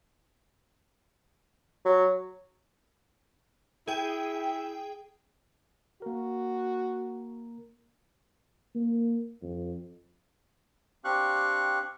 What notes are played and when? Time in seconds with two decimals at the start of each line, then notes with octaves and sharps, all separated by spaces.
1.85 F#3
3.88 E4 G#4 G5
6.02 A#3 F#4 A#4
8.75 A#3
9.43 F2
11.04 C4 D4 G4 F5 C#6 F#6